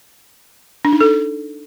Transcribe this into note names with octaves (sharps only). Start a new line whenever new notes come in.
D4
D#4
A4